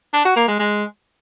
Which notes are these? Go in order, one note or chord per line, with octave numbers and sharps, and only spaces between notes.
D4
F#4
A#3
G#3
G#3